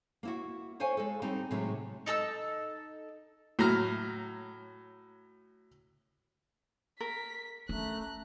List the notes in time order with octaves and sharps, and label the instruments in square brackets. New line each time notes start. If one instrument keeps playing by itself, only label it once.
[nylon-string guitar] A#3 E4 F#4
A4 C5 C#5 F5 G#5
G#3 A4
G3 C4 D#4
A2 C3 D#3 F#3 G#3 A3
[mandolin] D#4 A4 A5 E6
[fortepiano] A2 F#3 A#5 F6
[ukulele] A#4 [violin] B6
[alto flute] A3 [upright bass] C#4 [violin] A#5 F#6